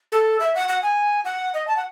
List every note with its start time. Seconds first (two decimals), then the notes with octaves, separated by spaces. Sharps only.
0.12 A4
0.40 E5
0.55 F#5
0.69 F#5
0.82 G#5
1.25 F#5
1.54 D#5
1.67 A5
1.77 F#5